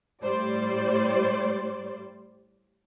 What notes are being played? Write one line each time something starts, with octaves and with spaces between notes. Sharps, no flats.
A2 G3 C5 D5